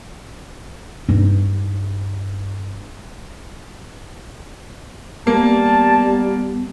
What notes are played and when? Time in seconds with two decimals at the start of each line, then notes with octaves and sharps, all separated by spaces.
1.09 G2 D#4
5.27 G3 A#3 B3 A5